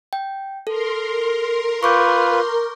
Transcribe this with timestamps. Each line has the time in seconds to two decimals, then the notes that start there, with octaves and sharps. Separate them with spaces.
0.13 G5
0.67 A4 A#4 C6
1.83 F4 B4 C#6 D6 G6